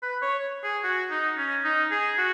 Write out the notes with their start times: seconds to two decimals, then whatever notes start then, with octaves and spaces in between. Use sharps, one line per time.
0.03 B4
0.22 C#5
0.64 G#4
0.84 F#4
1.11 D#4
1.38 C#4
1.64 D#4
1.91 G#4
2.18 F#4